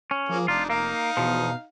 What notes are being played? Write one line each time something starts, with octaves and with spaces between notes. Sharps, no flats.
C#4
F3 A#3 G#4
F1 D4 D#4 F4
A#3 D#4 F5
E2 B2 F3